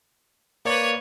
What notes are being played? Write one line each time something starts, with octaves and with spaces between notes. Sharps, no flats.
A#3 B4 C#5 D5